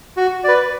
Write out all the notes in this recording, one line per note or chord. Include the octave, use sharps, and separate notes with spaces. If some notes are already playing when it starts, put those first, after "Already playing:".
F#4
B4 D5